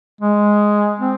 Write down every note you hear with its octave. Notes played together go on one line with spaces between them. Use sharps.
G#3
C4